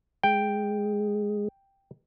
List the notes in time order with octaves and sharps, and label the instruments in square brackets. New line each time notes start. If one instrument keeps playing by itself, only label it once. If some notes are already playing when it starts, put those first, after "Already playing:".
[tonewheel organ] G#3 [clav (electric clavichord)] G5